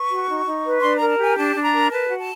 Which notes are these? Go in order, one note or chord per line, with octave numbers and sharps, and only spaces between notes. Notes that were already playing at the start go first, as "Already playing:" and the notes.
Already playing: B4 C#6
F#4
D#4
D#4
B4
D4 C6
A#4 A#5
A5
G4 G#5
D4 A5
D4
A#5
A#4
B4 A5
F#4
A5